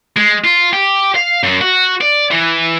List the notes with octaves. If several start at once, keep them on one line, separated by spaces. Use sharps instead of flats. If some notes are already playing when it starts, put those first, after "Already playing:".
G#3
F4
G4
F5
F#2
F#4
D5
E3